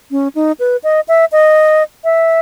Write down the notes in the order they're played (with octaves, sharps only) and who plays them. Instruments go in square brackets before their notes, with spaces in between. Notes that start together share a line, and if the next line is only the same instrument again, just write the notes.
[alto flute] C#4
D#4
B4
D#5
E5
D#5
E5